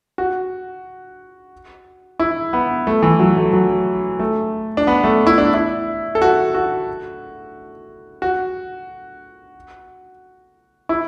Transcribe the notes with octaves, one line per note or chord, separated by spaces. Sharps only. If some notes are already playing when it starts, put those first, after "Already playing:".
F#4
E4
B3
A3
E3
F#3
A3
F#3
A3
D4
B3
A3
E4
D4
E4
A4
F#4
F#4
F#4
E4